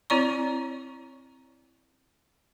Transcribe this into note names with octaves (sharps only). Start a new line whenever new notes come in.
C4 E4 C#5 D5 A#5 C#6